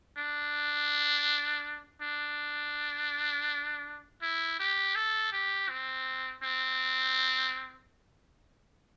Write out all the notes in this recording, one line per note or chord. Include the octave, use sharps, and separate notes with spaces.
D4
D4
E4
G4
A4
G4
C4
C4